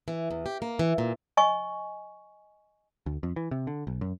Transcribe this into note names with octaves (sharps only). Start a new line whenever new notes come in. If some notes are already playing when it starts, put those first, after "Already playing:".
E3
E2
G4
A#3
E3
A#2
D#5 G#5 C#6
D2
F2
E3
C3
D3
B1
F#2